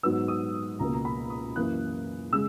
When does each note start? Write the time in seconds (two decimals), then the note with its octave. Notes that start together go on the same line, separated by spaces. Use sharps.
0.03 G#2 F#3 B3 E6
0.28 D#6
0.79 C#2 B2 A#3 A#5
0.94 A#5
1.05 B5
1.30 D#6
1.56 F#2 E3 A#3 F#6
2.33 C#3 G#3 E6